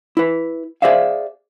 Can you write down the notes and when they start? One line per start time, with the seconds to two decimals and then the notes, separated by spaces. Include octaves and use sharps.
0.17 E4 B4
0.82 G#4 C5 D5 E5 F5